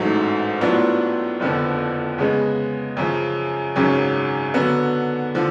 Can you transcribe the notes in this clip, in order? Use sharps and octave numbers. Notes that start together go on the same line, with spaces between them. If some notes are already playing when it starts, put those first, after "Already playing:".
Already playing: A1 G#2 F#3 A3
A2 F#3 B3 D4 F4
F#1 F2 D3 F3 B3
C#3 G#3 B3
F#2 C#3 F3
G#1 F#2 C#3 F#3 C#4
D3 F#3 B3
D3 F3